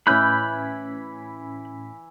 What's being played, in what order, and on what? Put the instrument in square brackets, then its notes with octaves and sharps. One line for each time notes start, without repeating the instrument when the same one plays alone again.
[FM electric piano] A2 C#4 B6 [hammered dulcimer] E3 E4 [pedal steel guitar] B5 F#6 G6